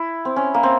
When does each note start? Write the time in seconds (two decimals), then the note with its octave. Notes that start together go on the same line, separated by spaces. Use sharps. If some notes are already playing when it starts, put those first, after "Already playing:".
Already playing: E4
0.25 C4
0.36 C#4
0.54 A#3
0.63 C4